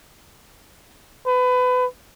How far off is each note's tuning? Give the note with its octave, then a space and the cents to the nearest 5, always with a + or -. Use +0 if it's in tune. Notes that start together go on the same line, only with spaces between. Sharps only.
B4 +25